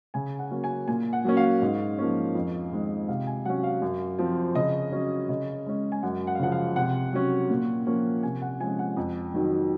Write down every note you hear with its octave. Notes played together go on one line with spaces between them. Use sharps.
C#3 G#5
F#5
F#3 A#3 C#4
G#5
A#2 G#5
F#5
F#3 A#3 C#4
F5
G#2
F3 A#3 C#4
F2
D#3 G#3 C4
C3 F5
G#5
F#3 C#4 F#5
F5
F#2
F3 C4
C#3 D#5
F#3 C#4
C#3 D#5
G#3 C#4
G#5
F#2 F#5
F#5
F5
C#3 F3 F#5
F5
C3 F#5
F#3 C#4
A#2
F3 A#3 C#4
C3 G#5
F#5
F3 G#3 C#4 G#5
F#5
F2
D#3 F#3